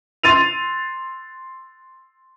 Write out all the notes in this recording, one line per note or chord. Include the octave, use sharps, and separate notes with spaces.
C6 A6 D#7 F7